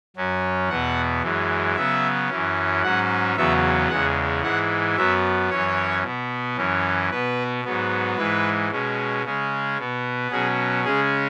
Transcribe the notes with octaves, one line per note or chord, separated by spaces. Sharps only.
F#2 F#3 C#4
E2 B2 B3 F#5
F#2 E3 G#3
C#3 F#3 B3 E5
F#2 E3 C#4
G#2 F#3 C#4 F#5
E2 C#3 F#3 B3 E5
E2 C#3 G#3 F#5
G#2 E3 G#3 F#5
F#2 F#3 B3 E5
F#2 E3 C#4 C#5
B2 B3
F#2 E3 C#4
B2 B3 B4
G#2 F#3 B3
G#2 E3 G#3 B4
B2 G#3 C#4
C#3 G#3 C#4
B2 B3
B2 F#3 C#4 G#4
C#3 G#3 C#4 G#4